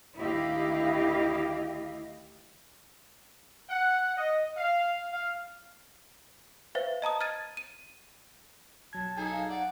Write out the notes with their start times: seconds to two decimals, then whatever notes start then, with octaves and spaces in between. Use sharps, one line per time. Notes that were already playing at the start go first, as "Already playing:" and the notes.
0.19 D2 D#3 E4 G4 D#5 F5
3.70 F#5
4.17 D#5
4.56 F5
5.12 F5
6.75 B4 C5 E5 F5
7.02 D#5 A5 A#5 D#6
7.21 F6 G#6 A6 D#7
7.57 D#7
8.93 B1 F#3 A5 G#6
9.17 D#4 G#4 A4 G#5
9.31 F5
9.50 D5 F#5